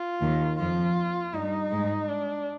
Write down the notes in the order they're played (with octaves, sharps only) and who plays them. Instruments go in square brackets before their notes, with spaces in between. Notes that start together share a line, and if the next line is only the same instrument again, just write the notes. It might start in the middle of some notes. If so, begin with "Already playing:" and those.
Already playing: [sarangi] F4
[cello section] D#2 D#3
[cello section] F2 F3 [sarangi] F4
[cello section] G2 G3 [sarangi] D#4
[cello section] G#2 G#3
[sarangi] D4